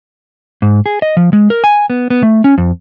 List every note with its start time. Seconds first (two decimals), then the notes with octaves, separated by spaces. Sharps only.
0.62 G#2
0.86 G#4
1.02 D#5
1.17 F3
1.33 G#3
1.50 A#4
1.64 G#5
1.90 B3
2.10 B3
2.23 A3
2.44 C#4
2.58 F2